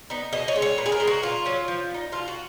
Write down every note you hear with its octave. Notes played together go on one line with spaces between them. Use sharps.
B3 D#4
B2 D#5
C#5
G#3 C#4
C#5
A#2 B4
G#4
A#4
G#3 B3 D#4
F#4
A#2 F4
F#3 C#4
F3
B3
D#4
B2 F4
F#4